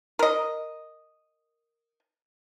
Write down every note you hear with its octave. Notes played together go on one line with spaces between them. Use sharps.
A#4 D#5